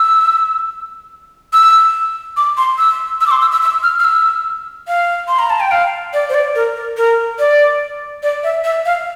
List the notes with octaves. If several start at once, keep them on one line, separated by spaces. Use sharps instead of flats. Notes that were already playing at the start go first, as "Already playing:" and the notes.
Already playing: E6
E6
D6
C6
E6
E6
D6
C6
E6
E6
E6
F6
F6
E6
F5
C6
A#5
A5
G5
F5
D5
C5
D5
A#4
A#4
A#4
D5
D5
E5
E5
F5